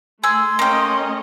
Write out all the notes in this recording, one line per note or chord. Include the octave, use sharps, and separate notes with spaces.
A3 G#4 C6 E6
A3 A#3 C#4 D#5 G5